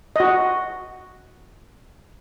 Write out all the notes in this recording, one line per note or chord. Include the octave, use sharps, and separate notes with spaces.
F#4 D#5